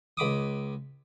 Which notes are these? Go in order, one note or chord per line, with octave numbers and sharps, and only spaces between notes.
C#2 B5 D6 D#6